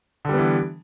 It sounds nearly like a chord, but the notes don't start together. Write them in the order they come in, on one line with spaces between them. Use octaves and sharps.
D3 G3 B3 E3